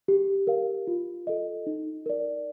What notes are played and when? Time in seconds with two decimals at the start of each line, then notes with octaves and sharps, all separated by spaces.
0.08 G4
0.47 A#4 F5
0.87 F4
1.27 A4 D#5
1.67 D#4
2.06 A#4 D5